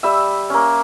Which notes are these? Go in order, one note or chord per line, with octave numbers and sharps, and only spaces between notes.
G3 E5 E6
A#3 C#4